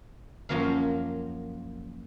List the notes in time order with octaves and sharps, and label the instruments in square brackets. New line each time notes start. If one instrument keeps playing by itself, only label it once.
[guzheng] F#2 F3 F#3 A#3 F5